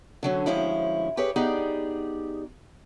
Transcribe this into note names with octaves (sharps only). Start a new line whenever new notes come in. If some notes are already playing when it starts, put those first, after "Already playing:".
D3 F#3 C#4
D2 G2 F3 G#3 C#4 E4
G4 G#4 B4 C#5
B3 D#4 G4 G#4 D5